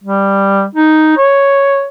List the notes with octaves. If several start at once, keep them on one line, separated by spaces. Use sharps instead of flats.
G3
D#4
C#5